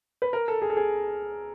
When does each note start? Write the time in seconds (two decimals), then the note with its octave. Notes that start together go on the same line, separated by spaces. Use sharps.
0.22 B4
0.33 A#4
0.48 A4
0.62 G#4
0.70 A4
0.77 G#4